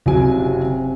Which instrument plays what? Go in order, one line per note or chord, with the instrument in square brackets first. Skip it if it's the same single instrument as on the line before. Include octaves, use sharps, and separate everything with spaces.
[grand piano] F#1 F#3 G#5 [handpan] C3